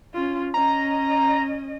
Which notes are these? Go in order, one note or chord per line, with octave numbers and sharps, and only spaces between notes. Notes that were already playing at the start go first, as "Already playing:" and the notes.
C#4 F4
C#4 D#5 A#5